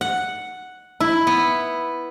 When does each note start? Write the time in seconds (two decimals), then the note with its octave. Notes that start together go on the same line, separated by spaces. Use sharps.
0.01 F#5
1.00 E4
1.27 B3